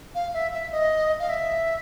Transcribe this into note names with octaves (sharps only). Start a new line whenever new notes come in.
F5
E5
E5
D#5
F5
E5